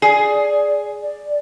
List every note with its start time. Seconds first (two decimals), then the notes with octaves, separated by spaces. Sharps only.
0.02 G#4 D5
1.02 D5